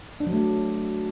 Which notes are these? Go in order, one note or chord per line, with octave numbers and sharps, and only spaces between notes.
D4
F#3
A3